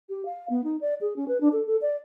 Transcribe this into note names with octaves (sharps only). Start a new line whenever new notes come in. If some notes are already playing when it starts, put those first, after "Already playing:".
G4
F5
B3
D#4
D5
G#4
C#4
B4
D4
A4
A4
D5